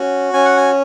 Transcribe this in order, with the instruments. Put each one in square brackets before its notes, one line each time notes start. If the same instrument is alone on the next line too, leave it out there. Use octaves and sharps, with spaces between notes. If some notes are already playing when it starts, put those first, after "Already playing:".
Already playing: [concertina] C#4 F#4
C#4 G#5
F#5
G#5